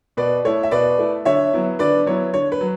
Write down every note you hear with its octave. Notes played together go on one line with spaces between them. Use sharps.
B2 B4 D5
A3 E4 C#5
E5
B2 B4 D5
A3 E4
D3 C#5 E5
F#3 B3 E4
D3 B4 D5
F#3 B3 E4 C#5
D3 C#5
B4
F#3